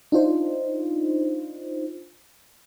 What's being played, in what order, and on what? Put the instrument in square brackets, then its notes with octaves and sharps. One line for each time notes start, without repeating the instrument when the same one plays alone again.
[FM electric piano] D4 D#4 F4 C5